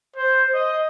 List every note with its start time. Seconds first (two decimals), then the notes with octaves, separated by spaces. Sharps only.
0.16 C5
0.54 D#5